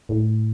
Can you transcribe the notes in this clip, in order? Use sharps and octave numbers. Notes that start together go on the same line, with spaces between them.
A2